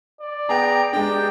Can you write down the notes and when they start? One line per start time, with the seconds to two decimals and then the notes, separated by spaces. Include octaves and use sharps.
0.21 D5
0.49 B3 G#4 G5 A#5
0.93 G#3 D4 G4 G5